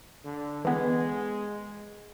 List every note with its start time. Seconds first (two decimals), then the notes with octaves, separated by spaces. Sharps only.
0.25 D3
0.65 E3 G#3 B3